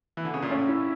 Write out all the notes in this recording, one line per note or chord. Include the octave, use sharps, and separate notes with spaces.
E3
D3
C#3
A#2
A2 C#4
E4